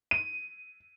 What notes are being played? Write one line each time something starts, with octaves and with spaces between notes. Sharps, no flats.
D#7